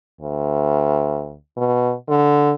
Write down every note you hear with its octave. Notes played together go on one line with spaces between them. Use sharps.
D2
B2
D3